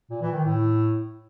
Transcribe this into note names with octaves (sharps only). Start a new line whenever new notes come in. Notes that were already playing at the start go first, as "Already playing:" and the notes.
A#2
E3
D#3
A2